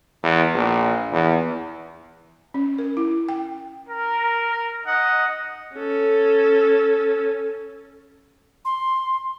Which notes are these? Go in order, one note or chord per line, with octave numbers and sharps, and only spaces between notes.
E2
A#1
E2
C#4
A#4
E4
G5
A#4
D#4 D#5 F#5
C#4 A4
C6